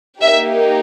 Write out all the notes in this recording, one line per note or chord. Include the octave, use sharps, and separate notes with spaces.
A#3 D#4 G4 E5